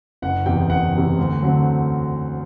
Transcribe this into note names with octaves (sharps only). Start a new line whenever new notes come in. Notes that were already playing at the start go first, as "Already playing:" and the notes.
F#1 F#5
E2 C3 G5
G5
F#1 F#5
E2 C3
D2
D3 F#3 C4